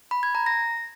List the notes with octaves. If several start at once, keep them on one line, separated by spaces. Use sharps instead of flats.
B5
G#6
A#5
A#6